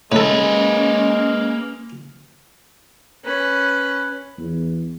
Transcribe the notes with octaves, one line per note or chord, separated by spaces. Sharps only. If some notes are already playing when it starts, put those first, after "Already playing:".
A2 G#3 A#3 C#4 A4 B4
C#4 B4
E2